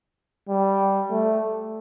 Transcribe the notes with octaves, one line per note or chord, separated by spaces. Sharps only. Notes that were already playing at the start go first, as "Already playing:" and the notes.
G3
A3